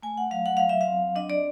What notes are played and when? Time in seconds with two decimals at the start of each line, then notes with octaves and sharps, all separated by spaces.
0.03 A3 G#5
0.17 F#5
0.31 F#3 F5
0.46 F#5
0.57 F#3 F5
0.69 E5
0.81 F5
0.87 C4
1.16 D4 D#5
1.30 D5